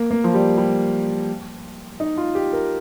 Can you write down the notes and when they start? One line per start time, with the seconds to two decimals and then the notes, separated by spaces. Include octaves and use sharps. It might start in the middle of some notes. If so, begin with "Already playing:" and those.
Already playing: A#3
0.11 A#3
0.24 F3
0.34 G3
0.58 G3
2.00 D#4
2.18 F4
2.35 G4
2.53 A#4